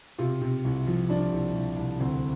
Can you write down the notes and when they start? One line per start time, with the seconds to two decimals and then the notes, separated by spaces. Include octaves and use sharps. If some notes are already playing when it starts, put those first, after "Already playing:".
0.18 C3 F4
0.42 C3
0.64 C2
0.87 F3
1.09 F3 D4
1.32 C2
1.55 C2
1.77 C2
1.99 D2 C4